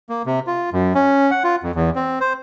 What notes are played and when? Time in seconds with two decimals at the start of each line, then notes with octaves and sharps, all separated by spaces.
0.09 A#3
0.26 C3
0.47 F4
0.73 F#2
0.95 C#4
1.31 F#5
1.44 F4
1.63 F2
1.75 E2
1.95 C4
2.20 C5